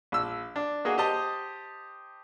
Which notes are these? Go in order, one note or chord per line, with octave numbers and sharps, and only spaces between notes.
A#1 E6
D4
A#3 F#4 G#4 D#5
G4 C5 D#5 A5